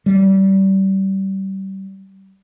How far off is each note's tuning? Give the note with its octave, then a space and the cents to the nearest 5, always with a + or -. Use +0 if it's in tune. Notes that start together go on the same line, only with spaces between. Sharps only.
G3 -25